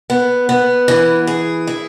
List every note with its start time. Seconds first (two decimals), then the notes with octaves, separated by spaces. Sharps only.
0.10 B3
0.49 B3
0.88 E3
1.27 G#4
1.67 E4